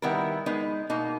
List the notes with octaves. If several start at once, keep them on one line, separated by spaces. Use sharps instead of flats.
D#3 G3 B3 E4 A#4
G#3 B3 D#4
B2 A#3 D#4